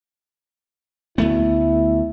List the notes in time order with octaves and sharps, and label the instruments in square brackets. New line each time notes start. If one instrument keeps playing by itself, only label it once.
[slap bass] D2 A3 B3 [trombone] E4